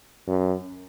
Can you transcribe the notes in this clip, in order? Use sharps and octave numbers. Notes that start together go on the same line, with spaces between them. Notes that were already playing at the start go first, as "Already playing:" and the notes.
F#2